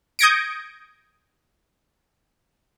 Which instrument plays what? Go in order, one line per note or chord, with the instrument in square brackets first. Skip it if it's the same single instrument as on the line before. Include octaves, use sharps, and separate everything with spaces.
[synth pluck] D#6 G6 G#6 A#6 C#7 D7